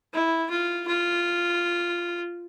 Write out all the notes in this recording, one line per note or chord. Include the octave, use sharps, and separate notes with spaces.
E4
F4
F4